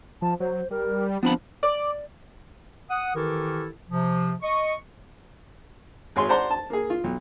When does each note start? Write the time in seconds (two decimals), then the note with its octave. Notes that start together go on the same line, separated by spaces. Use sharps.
0.22 F3 A5
0.40 F#3 C5
0.71 G3 A#4
1.23 F3 B3 C4 D4 B5
1.63 D5
2.91 F#5 D#6
3.16 D#3 E3 E4 G4 A4 A#4
3.90 C3 F3
4.43 D#5 C#6
6.16 G#1 G#4 C#5 G#5 C6
6.29 C5 D5 F#5 A5 A#5 C6
6.50 A5
6.70 A#3 G#4
6.90 F4
7.04 B1